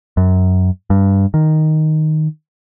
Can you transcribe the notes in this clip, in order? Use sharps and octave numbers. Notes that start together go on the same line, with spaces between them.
F#2
G2
D#3